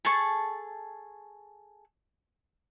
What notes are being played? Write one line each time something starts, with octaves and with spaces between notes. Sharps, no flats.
G#4 A4 A5 C#6